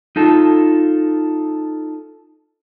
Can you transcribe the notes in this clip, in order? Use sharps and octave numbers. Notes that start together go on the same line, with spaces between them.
D#4 F4 A4